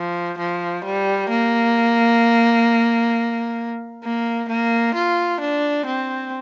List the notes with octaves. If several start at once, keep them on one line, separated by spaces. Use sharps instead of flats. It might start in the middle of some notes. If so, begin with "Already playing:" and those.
Already playing: F3
F3
G3
A#3
A#3
A#3
F4
D4
C4